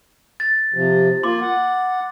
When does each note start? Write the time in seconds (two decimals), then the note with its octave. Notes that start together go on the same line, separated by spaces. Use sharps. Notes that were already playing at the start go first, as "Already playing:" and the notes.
0.40 A6
0.74 C3 F3
1.23 A#3 F4 C6 D6
1.41 F#5